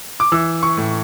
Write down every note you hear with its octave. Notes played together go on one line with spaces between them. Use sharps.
D6
E3 E6
C#6
A2